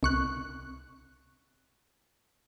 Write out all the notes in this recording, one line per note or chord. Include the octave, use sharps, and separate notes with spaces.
C2 C#6 F#6